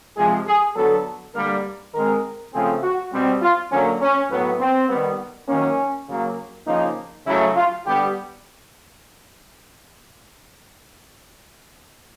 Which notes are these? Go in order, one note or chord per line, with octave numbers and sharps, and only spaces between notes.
C3 F3 G#3 G#4
G#4
D3 F#3 B3 A4
D3 G3 A#3 A#4
D#3 G#3 C4 A#4
C#3 F3 A3 C4 G#4
F#4
B2 G3 C4
F4
D3 F#3 A#3 C#4
C#4
A2 F#3 B3
C4
D#3 G3 B3
D#3 F#3 A#3 C#4
C#3 F#3 A#3
C#3 F3 A#3 D#4
C#3 F#3 A3 E4
F4
D3 G3 B3 G4